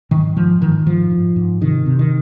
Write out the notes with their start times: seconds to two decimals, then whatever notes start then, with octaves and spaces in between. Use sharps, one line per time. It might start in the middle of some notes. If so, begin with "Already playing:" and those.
0.11 G#2 D#3
0.36 G#2 F3
0.61 G#2 D#3
0.86 G#2 F3
1.11 G#2
1.36 G#2
1.61 C3 D#3
1.86 C3
1.99 D#3